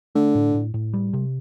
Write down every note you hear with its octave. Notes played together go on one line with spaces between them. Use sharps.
D3 A3
A2
A2
A2
G3
C3